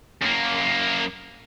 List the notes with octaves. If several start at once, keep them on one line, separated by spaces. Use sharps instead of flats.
F#2 A#3